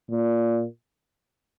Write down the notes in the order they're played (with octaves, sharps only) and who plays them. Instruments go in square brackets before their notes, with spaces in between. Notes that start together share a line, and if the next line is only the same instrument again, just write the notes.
[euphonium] A#2